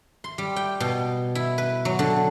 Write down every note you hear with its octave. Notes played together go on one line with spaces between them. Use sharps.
C6
G3
G5
B2
E4
B4
F#3
D3